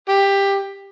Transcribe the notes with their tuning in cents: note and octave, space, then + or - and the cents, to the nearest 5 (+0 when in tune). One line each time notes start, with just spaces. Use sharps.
G4 +15